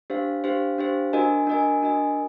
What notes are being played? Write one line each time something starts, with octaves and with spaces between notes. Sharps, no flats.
D4 G4 C5 F5
D4 G4 C5 F5
D4 G4 C5 F5
D4 F#4 A#4 D#5 G#5
D4 F#4 A#4 D#5 G#5
D4 F#4 A#4 D#5 G#5